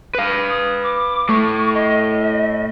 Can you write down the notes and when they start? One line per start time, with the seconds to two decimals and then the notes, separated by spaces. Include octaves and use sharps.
0.15 B4 F5
0.49 D#6
0.83 D6
1.29 A2 A3 C#6
1.74 D#5